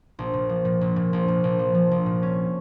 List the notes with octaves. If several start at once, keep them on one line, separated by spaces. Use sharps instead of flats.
A#1
A#2
F3
A#2
A#1
A#2
A#1
A#2
A#1
F3
F3
A#1
A#2
C#4